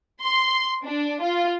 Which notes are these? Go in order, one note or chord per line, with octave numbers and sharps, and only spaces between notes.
C6
D4
F4